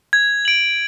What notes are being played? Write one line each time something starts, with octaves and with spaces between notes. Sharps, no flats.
G#6
D7 F#7